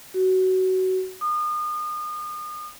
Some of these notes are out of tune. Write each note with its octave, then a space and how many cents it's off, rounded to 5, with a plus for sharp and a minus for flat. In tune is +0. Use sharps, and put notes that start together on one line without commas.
F#4 +20
D#6 -35